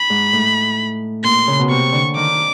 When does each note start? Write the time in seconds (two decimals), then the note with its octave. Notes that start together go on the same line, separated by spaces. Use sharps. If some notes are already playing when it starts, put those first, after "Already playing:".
Already playing: B5
0.10 G#2
0.33 A2
1.24 A#2 C6
1.47 C#3
1.59 B2
1.70 C3 C#6
1.92 D3
2.16 D#3 D6